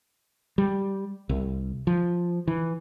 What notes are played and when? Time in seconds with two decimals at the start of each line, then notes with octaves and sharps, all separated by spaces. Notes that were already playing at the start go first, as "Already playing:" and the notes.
0.58 G3
1.29 C2
1.87 F3
2.47 E3